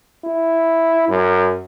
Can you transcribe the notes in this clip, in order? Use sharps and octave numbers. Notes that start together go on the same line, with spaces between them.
E4
F#2